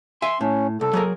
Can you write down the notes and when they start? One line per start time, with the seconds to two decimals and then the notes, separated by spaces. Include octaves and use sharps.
0.22 E5 G#5 C6
0.41 A2 C#4
0.81 C2 A4
0.93 F#3 G#4 A#4